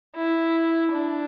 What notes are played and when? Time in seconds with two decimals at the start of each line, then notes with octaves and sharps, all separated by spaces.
0.15 E4
0.92 D4